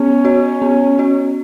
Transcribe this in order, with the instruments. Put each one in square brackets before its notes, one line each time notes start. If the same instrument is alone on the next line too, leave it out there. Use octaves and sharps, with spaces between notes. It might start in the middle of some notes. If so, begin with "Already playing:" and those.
Already playing: [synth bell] B3 [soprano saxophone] C#4
[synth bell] F#4 C#5
B3
F#4 C#5